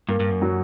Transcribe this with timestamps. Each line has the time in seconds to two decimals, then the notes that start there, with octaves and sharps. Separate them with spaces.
0.09 G2 A#3
0.20 G2
0.30 F#2
0.42 F#3